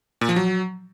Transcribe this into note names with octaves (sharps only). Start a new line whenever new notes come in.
A#2
F3
F#3